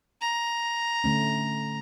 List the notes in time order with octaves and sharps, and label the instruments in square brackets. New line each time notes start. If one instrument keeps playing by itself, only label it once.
[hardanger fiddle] A#5
[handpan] D3 A3 C#4